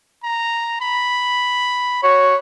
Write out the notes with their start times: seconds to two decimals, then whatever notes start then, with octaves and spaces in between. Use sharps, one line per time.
0.23 A#5
0.81 B5
2.03 F#4 C#5